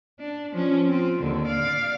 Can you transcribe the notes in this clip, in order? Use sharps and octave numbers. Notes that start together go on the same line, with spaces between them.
D4
F3 C#4
C4 F4
D#2 D3
D5 F5